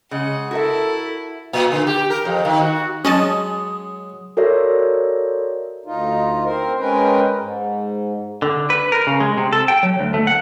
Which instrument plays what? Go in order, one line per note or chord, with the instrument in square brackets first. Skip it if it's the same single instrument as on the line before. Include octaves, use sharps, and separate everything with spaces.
[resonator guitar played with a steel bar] C#3 G#3 [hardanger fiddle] F#5
[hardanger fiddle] E4 [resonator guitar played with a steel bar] F#4 A#4 E5 [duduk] A4
[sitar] A#2
D3
G4
A#4
F2
D#3
F#4
[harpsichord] F#3 G#3 F#5 [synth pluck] C#4 D#5 A5 [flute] D#6
[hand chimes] F#4 A4 A#4 C#5 D5 E5
[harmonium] D2 D#4 F4
C4 A#4 C5
G#3 C#4 A#4 B4 G5
G#2
[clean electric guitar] D3
B4
A#4
C#3
G#3
C3
A4
G5
F#3
D2
A3
F#5